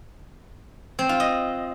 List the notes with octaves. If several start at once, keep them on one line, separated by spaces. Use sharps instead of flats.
C4
F4
D#5